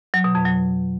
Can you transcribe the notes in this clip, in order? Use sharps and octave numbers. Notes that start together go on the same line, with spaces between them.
F#3
B2
F2
F#3